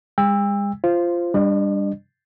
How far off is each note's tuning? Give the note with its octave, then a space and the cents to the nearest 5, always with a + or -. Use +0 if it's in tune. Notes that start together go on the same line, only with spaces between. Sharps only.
G#3 -40 G5 +40 E6 +0
F4 -15 C5 +0
G3 +15 D4 +0 D#5 -45